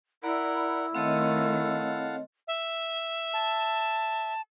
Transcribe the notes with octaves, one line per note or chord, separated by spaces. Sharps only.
E4 A#4 D5 F#5 B5
D#3 A3 C4 A4 C#5 D#5 F5 F#5
E5
A5